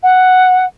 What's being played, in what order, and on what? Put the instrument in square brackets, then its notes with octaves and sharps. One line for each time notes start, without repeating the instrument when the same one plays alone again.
[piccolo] F#5